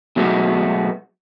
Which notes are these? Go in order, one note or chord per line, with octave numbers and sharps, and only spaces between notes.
B2 F#3 G#3 A3 B3